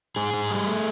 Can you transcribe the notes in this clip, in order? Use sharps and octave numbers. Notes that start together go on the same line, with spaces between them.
G#2 G#4
G#2
G3
A3